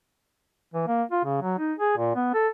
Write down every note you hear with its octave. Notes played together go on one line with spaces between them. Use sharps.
E3
A#3
F4
C#3
F#3
D#4
G#4
A#2
B3
A4